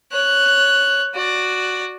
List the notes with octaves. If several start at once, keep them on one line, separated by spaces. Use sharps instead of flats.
C#5 F#6
F#4 D5